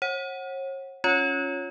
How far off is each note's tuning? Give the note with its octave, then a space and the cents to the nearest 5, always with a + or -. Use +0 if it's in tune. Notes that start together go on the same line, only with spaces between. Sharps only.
C#5 -40 F#5 +5
C#4 +0 F4 +10 C#5 +0